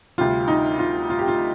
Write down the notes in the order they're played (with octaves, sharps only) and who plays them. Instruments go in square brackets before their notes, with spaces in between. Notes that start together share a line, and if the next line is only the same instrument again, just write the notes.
[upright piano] D2 C3 G3 F4
D#4
F4
F4
G4
F4